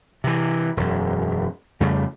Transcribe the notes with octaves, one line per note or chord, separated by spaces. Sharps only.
C3 E3
E1 F#2
F2 C#3 G3 A3